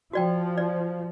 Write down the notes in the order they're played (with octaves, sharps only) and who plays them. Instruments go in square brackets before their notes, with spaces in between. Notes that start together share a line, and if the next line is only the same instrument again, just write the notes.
[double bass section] F3 [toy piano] F#4 D5 G5
[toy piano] D5